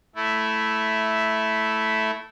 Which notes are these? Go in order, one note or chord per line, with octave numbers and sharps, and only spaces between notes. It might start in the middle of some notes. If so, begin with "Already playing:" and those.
A3 E4